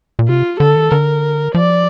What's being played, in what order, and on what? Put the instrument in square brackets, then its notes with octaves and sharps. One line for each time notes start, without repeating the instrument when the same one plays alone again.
[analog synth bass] A#2
[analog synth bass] C3 [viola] F4
[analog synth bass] D3 [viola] A4
[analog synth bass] D#3
[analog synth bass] D3 [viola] A#4
[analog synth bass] F3 [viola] D5